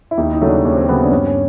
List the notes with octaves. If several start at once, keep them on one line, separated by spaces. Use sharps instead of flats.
E4
D#2 D#4
E4
D#4
C#3 F#3 A3
D4
D#2 C#4
C4
C#3 F#3 A3 B3
D4
G2 C#4
C#4